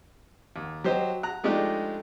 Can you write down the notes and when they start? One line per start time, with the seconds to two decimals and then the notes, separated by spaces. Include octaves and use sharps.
0.56 D#2
0.84 F#3 G4 C5 D#5
1.23 A#5 F#6
1.43 F3 G#3 A3 D4 D#4 G4